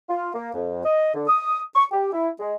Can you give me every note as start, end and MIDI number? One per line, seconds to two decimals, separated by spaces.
0.09 0.29 65
0.34 0.51 58
0.54 0.82 41
0.85 1.14 75
1.15 1.25 50
1.28 1.60 87
1.76 1.85 85
1.92 2.11 67
2.13 2.29 64
2.40 2.54 56